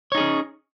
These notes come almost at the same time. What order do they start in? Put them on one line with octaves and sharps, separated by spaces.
C#5 D#4 G#4 C#4